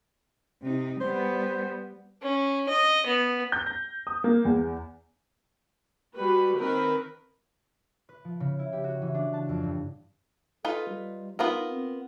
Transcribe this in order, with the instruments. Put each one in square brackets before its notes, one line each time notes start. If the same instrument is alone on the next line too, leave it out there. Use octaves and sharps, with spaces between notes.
[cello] C3 D#4
[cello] G3 B3 [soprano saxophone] C5
[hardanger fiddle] C#4
D#5
B3
[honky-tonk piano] G6
A#6
D#6
A#3
E2
[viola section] G3 F#4 B4
D#3 C4 A#4 B4
[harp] B4
F3
C#3
E4
G4
F#4
E3
D4
A5
F2
G2
[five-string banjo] D#4 F4 B4 [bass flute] A4
[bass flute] G3
[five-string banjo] B3 F4 A#4 [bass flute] D#4
[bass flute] C4